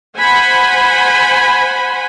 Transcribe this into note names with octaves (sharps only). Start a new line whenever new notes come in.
C5 F#5 G#5 B5